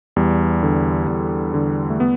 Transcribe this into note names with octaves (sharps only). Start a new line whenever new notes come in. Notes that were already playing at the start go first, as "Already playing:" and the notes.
E2 G3
D3
E2
D3
A3
B3